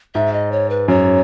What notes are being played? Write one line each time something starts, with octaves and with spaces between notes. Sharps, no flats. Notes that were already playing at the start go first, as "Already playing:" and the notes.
G#2 E5
D#5
C#5
B4
F#2 C#5